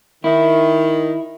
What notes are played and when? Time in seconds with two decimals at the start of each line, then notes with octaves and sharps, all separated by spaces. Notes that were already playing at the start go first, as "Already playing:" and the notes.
0.24 D#3 E4